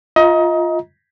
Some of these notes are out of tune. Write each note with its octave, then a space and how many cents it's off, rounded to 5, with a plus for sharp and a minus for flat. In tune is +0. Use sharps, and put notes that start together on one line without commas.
F4 +0 D#5 +25 A#5 +20